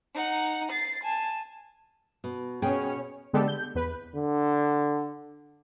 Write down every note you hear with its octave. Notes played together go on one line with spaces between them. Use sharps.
D#4 F#5
A6 C7
G#5 A5
B2
B2 C#4 G#4 C#5 G5
D3 G#3 B3 D4 G4 A4
G6
E2 B4
D3